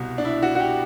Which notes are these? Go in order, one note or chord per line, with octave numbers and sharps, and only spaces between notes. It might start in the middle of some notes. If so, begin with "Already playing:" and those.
Already playing: C2 B2 G3
D4
E4
F#4
F#4
G4